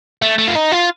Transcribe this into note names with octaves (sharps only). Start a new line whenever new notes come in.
A3
A3
F4
D#4
F4